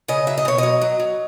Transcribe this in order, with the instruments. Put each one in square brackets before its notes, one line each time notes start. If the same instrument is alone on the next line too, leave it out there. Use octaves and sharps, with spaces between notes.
[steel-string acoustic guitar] C#3 D#5
F#3 E5
D#5
B2 C#5
F#3 D#5
F#3
F#3